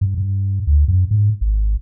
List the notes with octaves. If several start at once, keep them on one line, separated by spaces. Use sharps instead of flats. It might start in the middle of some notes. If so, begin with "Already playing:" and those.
G2
G2
D2
F#2
G#2
G#1